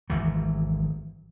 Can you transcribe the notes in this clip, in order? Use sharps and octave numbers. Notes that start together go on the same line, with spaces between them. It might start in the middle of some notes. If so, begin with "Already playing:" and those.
G#1 E3 F#3